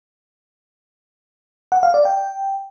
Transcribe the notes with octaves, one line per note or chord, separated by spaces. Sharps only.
F#5
F5
D5
G5